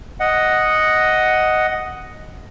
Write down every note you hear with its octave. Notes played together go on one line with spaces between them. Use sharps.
D#5 F#5